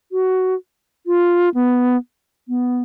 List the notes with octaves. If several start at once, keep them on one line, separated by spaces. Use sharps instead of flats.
F#4
F4
B3
B3